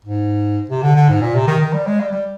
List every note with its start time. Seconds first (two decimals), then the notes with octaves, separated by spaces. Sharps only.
0.05 G#2
0.70 C3
0.83 D3
0.96 D3
1.09 G#2
1.21 A#2
1.35 C3
1.48 D#3
1.61 D#3
1.74 G3
1.87 G#3
2.00 G3
2.13 G3